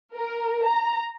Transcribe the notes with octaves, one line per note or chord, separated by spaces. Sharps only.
A#4
A#5